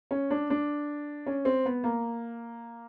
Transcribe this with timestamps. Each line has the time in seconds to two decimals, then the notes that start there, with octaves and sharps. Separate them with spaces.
0.11 C#4
0.31 D4
0.50 D4
1.26 C#4
1.45 C4
1.66 B3
1.84 A#3